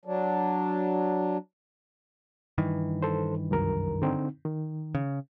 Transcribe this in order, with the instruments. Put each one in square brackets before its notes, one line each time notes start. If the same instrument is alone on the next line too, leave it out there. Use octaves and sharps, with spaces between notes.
[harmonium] F#3 D4
[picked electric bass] G2 D#3 E3
[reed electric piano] A4 C5
C2 F#2 A#4
D3 C4 D#4
D#3
[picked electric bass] C#3